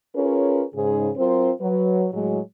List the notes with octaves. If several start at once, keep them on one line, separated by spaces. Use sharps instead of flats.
C#4 F4 G#4 A#4 B4 C#5
G#2 C#3 G#4
F#3 C4 F4 A#4 C5
F#3 B4
A2 F#3 G#3